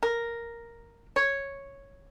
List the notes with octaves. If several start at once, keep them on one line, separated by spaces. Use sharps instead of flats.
A#4
C#5